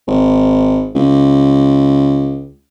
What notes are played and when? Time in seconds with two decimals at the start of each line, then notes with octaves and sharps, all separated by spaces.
0.07 G#1
0.95 C#2